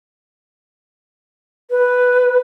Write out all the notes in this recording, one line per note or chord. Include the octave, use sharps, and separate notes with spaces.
B4